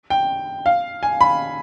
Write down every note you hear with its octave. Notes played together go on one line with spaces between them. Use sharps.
G5
F5
G#5
B5